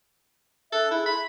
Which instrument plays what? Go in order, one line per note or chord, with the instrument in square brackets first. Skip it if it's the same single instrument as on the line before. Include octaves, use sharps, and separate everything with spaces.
[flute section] D4 E5 F#6 [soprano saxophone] A4
[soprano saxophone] E4 [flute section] G#4
[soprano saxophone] B5 [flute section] C6